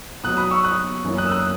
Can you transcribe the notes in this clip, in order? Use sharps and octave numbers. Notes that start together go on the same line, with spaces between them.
B2 F#3 B3 D#6 F#6
B5 D#6
C#6 E6
D#6 F#6
F#2 E3 A#3 C#4
D#6 F#6
E6
D#6 F#6